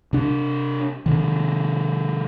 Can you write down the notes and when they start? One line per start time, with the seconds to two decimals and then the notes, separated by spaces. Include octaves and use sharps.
0.13 C3 D4
1.06 C3 D#3